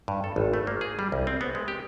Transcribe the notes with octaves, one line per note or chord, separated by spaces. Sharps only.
G2
A4
G#1
A3
A#3
G#4
G3
C2
C4
B3
G#3
G4